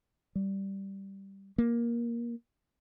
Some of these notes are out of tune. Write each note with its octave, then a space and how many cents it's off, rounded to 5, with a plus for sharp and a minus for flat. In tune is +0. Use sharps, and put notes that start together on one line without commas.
G3 -5
A#3 +15